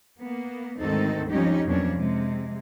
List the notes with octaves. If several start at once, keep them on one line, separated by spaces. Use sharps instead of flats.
A#3 B3
D2 G#2 D#3 C4 D#4 A4
F2 F3 G3 C#4 D#4 G4
F2 B2 F#3 A#3 C#4 D4
C3 G#3